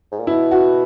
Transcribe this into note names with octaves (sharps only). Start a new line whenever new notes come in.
G#2
A#2
B2 E4
F#4